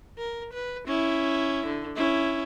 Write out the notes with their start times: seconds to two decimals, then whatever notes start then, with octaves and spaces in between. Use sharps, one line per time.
0.18 A#4
0.53 B4
0.87 C#4 E4
1.67 D3
1.96 C#4 E4